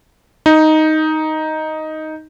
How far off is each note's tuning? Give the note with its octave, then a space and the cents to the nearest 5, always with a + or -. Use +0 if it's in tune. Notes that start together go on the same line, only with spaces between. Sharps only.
D#4 +5